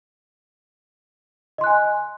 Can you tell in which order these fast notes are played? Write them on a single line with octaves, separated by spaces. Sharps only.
D#5 C6 F#6 G#5